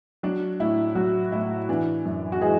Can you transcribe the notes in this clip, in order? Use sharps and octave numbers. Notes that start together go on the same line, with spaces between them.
F#3 D4
A2 E4
F#3 F#4
A2 E4
E3 D4
F#2
F#4
E3 G#3 G#4